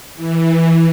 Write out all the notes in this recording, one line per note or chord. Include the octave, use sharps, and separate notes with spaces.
E3